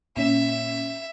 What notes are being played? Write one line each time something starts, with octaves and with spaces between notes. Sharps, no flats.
A#2 C#4 E5